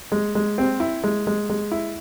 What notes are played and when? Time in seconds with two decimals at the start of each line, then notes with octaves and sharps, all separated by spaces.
0.12 G#3
0.35 G#3
0.58 C4
0.80 E4
1.04 G#3
1.27 G#3
1.49 G#3
1.72 E4